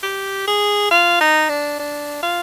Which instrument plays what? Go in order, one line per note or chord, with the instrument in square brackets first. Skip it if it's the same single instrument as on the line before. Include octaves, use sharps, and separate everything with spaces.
[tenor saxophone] G4
G#4
F4
D#4
D4
D4
F4